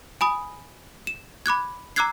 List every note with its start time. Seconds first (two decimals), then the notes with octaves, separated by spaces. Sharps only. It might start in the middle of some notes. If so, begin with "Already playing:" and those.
0.21 G#5 B5 D#6
1.07 E7
1.46 B5 D6 F#6 G#6
1.96 A#5 D6 E6 F#6 G#6 C7